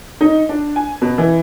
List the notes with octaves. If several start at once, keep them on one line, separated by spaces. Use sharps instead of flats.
D#4
D4
G#5
B2
E3